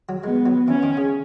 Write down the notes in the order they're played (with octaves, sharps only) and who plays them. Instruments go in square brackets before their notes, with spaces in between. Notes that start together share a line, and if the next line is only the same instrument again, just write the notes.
[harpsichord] F#3
[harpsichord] G#3 [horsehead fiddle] B3
[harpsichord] F#3
[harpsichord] E3 [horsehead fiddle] C#4
[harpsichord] D#3
C#3